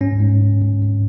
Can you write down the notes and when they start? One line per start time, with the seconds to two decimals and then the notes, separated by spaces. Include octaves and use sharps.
0.01 G#2 C#4
0.20 G#2
0.41 G#2
0.62 G#2
0.82 G#2